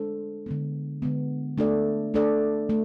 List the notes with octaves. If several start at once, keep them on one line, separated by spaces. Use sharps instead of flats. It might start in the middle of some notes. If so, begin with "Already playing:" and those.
Already playing: G#3 D4 A4 C5
D3 G#3 B3
D3 G#3 B3
A3 D4 A4 D5
A3 D4 A4 D5
A3